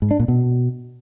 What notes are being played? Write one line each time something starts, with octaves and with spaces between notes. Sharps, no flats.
G#2
D4
A#2
B2